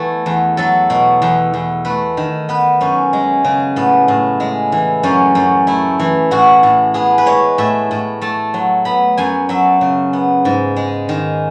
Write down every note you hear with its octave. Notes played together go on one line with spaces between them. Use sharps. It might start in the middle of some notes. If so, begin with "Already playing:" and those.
Already playing: E3 A3 B3
E2
F#3 A4
B2
E2
E2
A3 B4
D#3
B3 B4
F#2 C#4
G#3
C#3
A2 B3
A2
G#3
E3
F#2 C#4
F#2
A3 E4
E3
A2 F#4
A2
B3 G#4
B4
G#3 C#5
A2 E5
A2
A3 A5
F#3
B3 B5
F#2 G#5
F#3 E5
C#3
B3
G#2
G#3
D#3